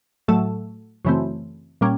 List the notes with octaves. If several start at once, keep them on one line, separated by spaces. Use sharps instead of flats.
A2 F#3 A3
F#2 C#3 E3 A3 C4
A#2 G3 A#3 C#4